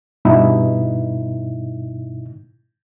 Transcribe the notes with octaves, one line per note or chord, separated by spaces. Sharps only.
G2 B2 D#4 E4